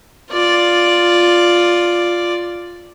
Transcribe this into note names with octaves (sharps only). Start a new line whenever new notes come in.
F4 D5